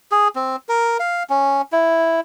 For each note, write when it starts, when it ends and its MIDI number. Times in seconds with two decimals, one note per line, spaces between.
0.11 0.28 68
0.36 0.56 60
0.69 0.97 70
1.00 1.23 77
1.30 1.62 61
1.72 2.20 64